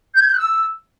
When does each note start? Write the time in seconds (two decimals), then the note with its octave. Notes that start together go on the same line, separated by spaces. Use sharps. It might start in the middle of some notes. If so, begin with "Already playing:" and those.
0.14 G6
0.20 G#6
0.26 G6
0.32 F#6
0.38 E6